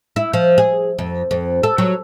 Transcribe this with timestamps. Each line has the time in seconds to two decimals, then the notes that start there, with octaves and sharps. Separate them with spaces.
0.16 E4
0.34 F3
0.58 G#4
0.99 F2
1.31 F2
1.63 A4
1.78 F#3